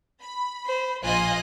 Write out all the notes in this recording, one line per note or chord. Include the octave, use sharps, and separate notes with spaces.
B5
C5
A#1 F4 D#5 G#5 F#6